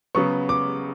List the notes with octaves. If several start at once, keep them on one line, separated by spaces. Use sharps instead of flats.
C#3 F#3 B3 C#6
D6